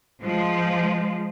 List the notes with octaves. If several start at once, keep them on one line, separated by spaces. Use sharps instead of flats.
F3 G#3